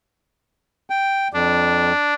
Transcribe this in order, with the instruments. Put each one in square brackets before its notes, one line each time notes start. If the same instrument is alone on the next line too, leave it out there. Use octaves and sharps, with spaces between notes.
[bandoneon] G5
[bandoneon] F2 [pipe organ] D4